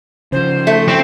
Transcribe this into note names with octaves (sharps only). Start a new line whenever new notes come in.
C#3 F3 C5
A3
C4